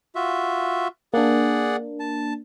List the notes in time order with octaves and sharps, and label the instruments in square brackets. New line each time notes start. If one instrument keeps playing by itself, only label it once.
[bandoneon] F4 F#4 E5
[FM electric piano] A#3 D4 [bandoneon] G#4 D5 F#5
[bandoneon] A5